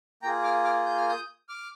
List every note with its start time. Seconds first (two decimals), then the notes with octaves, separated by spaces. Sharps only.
0.22 A#3 F4 G#4 G5 A#5
0.43 D6 F6
0.64 D6 F6
0.86 G6
0.97 F6
1.09 D#6 G6
1.49 D6 F6